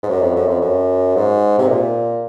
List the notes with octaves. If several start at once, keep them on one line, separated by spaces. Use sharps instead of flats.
G#2
F#2
F2
F#2
F2
F#2
G#2
C3
A#2